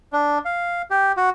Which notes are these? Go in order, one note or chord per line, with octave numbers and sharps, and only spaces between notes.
D4
F5
G4
F#4